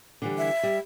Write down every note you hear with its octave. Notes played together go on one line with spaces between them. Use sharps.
D3 E3 G3
E5
G3